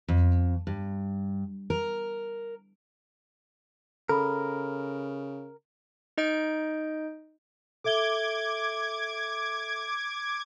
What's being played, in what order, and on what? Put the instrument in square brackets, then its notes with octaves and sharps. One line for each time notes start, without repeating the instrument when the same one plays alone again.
[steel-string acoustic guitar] F2
G2
A#4
[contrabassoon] C#3 [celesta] A4 B5 [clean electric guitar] A#4
[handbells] D#4 D#5 G6 D7
[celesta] A4 E5 G7 [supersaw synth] D6 G#6